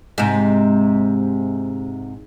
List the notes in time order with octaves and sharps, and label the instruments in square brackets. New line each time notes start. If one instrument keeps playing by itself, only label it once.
[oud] G#2 C3